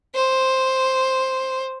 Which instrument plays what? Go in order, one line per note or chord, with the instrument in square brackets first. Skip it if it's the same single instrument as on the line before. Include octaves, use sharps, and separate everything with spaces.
[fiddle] C5